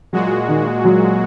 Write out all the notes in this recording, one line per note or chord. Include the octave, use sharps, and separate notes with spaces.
A#2 F#3 G#3 F#4
D#3
F#3